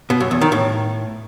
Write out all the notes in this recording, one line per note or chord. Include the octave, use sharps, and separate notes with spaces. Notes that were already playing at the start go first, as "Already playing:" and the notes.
B2
F#2
E2
D#3
A2